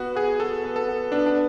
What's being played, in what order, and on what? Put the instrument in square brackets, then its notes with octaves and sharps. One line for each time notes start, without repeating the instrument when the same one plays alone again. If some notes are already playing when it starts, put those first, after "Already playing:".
Already playing: [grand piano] B3 F#4
[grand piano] F#4 [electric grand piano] G#4
[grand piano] F#4 [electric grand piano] A4
[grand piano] B3
[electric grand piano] A4
[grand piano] B3
[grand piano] B3 [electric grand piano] D4
[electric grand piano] D4